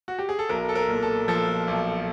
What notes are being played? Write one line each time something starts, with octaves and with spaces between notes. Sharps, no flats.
F#4
G4
G#4
A4
B1 A#4
A4
A#4
A#2
A4
F3 A4
B1